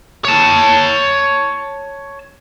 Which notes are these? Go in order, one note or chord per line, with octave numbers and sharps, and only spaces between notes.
C#5 A5